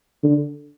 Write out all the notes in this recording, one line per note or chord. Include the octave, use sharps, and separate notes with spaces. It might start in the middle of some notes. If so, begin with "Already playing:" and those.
D3